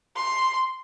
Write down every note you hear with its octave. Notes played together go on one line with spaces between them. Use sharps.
C6